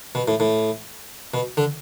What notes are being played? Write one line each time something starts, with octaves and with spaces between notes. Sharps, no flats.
B2
A2
A2
B2
D3